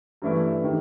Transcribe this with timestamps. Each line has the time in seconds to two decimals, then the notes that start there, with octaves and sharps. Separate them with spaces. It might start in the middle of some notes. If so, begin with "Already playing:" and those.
0.22 G2 E3 A3 C#4 E4
0.64 D#3 G3